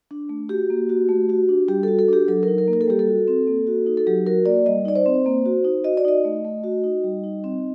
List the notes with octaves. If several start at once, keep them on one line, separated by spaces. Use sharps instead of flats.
D4
A3
F#4 G4
A#3
F#4
A3
F#4
D4
G3 G4
F#4 A4
A4
D4 G4
F#3 A4
A#4
D#4
A#4
A#3
A#4
A4
G3 G4
A4
F#4
C4
A#3
F#4
D#4
A4
F#3 G4
F#4 A#4
A#3 D5
G3 D#5
D#4 D5
C5
C4
A#3
F#4
D#4
F#4 D#5
D5
D#4 D#5
A3
A3
F#4
D#4
G3
D#4
C4